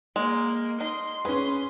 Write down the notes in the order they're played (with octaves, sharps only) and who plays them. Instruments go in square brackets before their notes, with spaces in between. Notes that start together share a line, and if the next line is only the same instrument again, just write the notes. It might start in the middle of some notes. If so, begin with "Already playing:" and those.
[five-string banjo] G#3 [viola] A#3
[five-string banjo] D#4 [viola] C6
[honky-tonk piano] C#4 B4 [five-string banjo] G#4